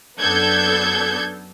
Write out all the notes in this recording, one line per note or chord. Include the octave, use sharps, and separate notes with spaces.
F#2 B3 D4 A4 G6 G#6